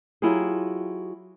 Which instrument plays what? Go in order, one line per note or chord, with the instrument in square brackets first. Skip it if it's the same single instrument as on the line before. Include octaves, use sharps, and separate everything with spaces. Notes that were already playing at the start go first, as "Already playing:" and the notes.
[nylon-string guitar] F#3 E4 F4 G4 G#4